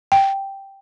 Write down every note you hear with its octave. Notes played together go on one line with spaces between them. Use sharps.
G5